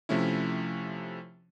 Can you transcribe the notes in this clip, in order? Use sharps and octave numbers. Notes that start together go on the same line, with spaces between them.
C3 F3 A3 C#4 E4